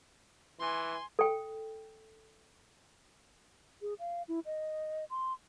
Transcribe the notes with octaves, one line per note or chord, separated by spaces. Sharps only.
E3 G#5 C6
A4 G5
G#4
F5
E4
D#5
C6